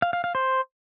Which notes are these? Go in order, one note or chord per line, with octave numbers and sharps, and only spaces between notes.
F5
F5
F5
C5